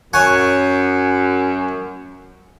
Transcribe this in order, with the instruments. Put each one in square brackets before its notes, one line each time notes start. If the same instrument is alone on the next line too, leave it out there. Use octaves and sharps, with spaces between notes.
[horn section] F#2 [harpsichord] C#5 F#5 G#5